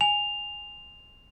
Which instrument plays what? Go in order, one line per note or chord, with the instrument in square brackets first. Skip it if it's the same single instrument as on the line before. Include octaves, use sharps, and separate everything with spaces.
[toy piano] G#5 [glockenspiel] F7